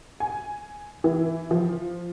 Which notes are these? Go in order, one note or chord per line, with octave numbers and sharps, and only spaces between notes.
G#5
E3
F3